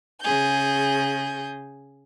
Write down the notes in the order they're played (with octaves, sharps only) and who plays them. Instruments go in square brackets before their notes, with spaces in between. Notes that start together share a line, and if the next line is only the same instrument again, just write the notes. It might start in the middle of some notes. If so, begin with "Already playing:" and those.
[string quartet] C#3 G#4 G6